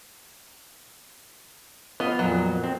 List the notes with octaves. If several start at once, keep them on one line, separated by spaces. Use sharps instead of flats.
B3 F4 D#5
F2 A#2 F#3
C4